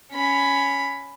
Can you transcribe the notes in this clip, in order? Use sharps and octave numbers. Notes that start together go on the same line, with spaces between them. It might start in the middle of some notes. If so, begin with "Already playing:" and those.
C#4 B5